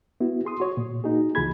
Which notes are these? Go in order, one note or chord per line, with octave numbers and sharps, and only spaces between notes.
B3 E4 F#4
G#4 C6 D#6
F#4 C#5
A#2
A#3 D#4 F#4 G#4
C#2 E3 F4 G#4 B5 G#6